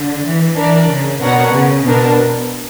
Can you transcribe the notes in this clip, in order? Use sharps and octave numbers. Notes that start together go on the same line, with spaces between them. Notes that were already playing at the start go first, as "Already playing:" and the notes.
Already playing: D3
E3
E3 D4 A#4 D5
C#3
B2 B3 D4 A#4 C#5 F#5
C#3
B2 B3 D4 A#4